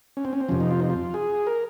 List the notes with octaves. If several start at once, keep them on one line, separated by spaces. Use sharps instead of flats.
C#4
C4
C#4
C4
F2 C3 F3 C#4
D#4
F4
D#4
F4
G#4
A#4